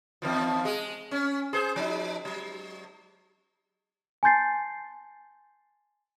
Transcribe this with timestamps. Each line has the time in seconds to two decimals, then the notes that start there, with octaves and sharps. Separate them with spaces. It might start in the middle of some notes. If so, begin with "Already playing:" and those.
0.22 E2 D#3 F3
0.65 G#3 G#4
1.11 C#4
1.53 G#4 C5
1.76 F3 D#4
2.25 F#3
4.23 G#5 A5 C6 G6 A6 C7